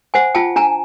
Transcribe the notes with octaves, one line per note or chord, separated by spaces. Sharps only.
C5 F#5 G#5
F4 G5 A5
D4 G#5 A#5